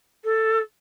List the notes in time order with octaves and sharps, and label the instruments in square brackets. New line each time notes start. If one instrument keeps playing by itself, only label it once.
[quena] A4